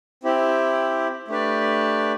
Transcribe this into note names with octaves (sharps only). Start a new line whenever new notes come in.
C4 E4 G4
A3 D4 G4 B4 D5